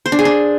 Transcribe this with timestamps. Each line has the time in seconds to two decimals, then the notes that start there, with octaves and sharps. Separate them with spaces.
0.06 C5
0.12 D4
0.19 G#4
0.25 D4